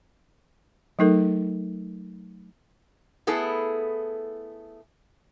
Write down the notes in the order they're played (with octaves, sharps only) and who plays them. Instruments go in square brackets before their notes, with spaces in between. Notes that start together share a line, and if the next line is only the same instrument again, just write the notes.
[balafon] F#3 A3 D#4 A4 A#4
[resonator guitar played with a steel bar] A3 B3 E4 G#4 A4